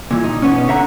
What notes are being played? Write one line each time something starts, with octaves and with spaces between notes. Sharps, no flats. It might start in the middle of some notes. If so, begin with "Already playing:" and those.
A#2 E3
D#4
B2 B3 C#4
D3 E5 F#5 A#5